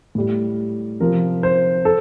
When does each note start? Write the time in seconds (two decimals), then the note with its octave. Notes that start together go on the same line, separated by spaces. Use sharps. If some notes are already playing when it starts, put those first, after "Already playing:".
0.15 A2 G3
1.00 C3 F3 A#4
1.43 C5
1.85 A4